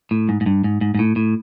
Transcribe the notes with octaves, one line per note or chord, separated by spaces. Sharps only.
A2
G#2
G#2
G2
G#2
G#2
G#2
A2
A2